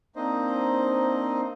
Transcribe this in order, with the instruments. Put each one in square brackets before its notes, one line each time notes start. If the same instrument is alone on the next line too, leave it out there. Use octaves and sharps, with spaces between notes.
[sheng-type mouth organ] A#3 C4 D4 D#4 C5 D#5